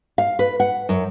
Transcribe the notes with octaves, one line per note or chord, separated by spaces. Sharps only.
F5
B4
F#5
F#2